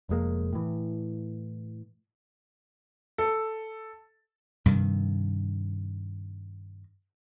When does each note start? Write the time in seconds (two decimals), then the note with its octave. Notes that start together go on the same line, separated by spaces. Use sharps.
0.09 F1 F2 G#3 A#3
0.53 A2 E3
3.18 A4
4.66 G2 C3 D#3